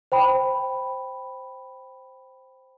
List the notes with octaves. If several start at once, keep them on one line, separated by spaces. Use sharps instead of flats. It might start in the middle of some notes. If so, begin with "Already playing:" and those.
C5 G5 B5